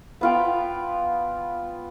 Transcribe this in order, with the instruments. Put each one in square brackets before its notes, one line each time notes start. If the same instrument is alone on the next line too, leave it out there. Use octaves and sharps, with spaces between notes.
[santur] B3 F4 G5